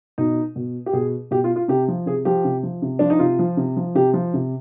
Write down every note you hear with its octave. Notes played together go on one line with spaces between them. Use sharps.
B2 D#4
B2
G4
B2 G#4
B2 G4
F4
F4
C3 G4
F3
C3 G#4
F3 G4
C3
F3
C3
F3 D4
D#4
C3 F4
F3
C3
F3
C3 G4
F3
C3